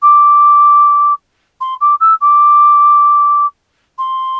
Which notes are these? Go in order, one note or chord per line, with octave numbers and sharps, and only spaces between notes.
D6
C6
D6
E6
D6
C6